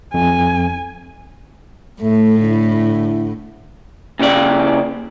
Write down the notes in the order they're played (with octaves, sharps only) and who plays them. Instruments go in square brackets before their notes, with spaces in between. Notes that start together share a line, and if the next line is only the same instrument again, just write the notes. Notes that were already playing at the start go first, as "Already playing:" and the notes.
[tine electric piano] F2 [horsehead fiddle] G#5
[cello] A2 [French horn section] A3
[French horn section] D3 E4
[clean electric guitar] A#2 C#3 G4 D5